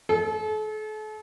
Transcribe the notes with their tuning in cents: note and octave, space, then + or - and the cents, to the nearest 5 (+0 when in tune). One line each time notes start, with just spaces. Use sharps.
A4 -40